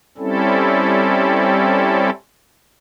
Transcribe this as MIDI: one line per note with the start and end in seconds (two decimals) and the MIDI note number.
0.18 2.10 55
0.18 2.10 60
0.18 2.10 61
0.18 2.10 64
0.18 2.10 69